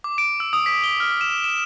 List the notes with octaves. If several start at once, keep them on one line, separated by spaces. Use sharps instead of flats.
D6
D7
E6
D#6
B6
G7
F6
E7
E7